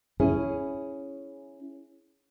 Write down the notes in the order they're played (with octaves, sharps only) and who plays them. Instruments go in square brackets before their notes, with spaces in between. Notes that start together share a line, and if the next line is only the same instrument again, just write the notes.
[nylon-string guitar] C#4 E4 G#4